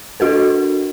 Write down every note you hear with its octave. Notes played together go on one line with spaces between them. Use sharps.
D4 F#4 A4 A#4